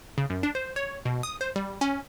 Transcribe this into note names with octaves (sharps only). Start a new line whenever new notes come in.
C#3
F#2
D4
C5
C#5
B2
D#6
C5
G3
C#4